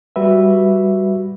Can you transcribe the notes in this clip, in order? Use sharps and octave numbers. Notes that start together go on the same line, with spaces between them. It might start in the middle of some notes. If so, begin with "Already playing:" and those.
G3 F#4 B4 E5